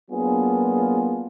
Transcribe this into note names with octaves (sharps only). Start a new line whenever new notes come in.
F#3 A#3 B3 D4 F4 G#4